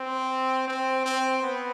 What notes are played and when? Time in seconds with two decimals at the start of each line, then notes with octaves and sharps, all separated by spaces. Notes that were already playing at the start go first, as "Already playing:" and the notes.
Already playing: C4
0.67 C4
1.05 C4
1.42 B3